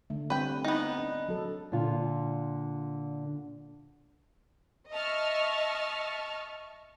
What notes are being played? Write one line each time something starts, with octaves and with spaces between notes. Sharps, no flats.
D3 A3
G3 C4 B4 G5
B3 D#4
D4
F#3 A4
A#2 D3 F4
D#5 E5 A5 C#6 F6